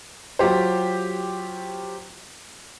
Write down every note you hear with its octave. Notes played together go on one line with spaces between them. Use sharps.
F#3 F4 G4 C5